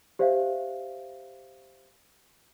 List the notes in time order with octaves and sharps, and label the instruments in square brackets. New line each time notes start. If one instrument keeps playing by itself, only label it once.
[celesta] G4 C5 D5 E5 F5